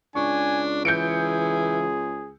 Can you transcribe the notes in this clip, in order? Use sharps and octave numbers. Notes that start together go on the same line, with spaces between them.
C#2 D4 G#5 C#6
E3 G#4 G6 C#7 D7